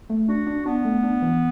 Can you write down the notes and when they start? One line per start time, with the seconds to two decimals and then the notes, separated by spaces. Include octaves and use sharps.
0.10 A3
0.28 D4 F#4
0.47 D4
0.66 B3 D4
0.85 A3
1.03 D4
1.22 E3